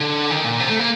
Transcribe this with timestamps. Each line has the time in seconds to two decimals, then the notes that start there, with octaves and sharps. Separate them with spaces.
0.01 D3
0.30 D#3
0.44 A#2
0.60 C3
0.70 A3
0.79 A#3